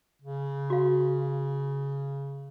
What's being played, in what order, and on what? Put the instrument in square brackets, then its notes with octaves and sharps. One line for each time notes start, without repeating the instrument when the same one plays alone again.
[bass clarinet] C#3
[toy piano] F#4 F5